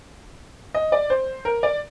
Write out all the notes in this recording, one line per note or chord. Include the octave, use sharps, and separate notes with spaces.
D#5
D5
C5
A#4
D5